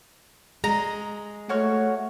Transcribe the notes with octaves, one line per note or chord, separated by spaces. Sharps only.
G#3 A#5
A3 F#4 C#5 F6